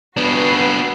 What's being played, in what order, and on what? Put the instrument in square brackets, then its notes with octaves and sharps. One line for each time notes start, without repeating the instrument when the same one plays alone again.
[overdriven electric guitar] B3 D4 [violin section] F#4 B4 C7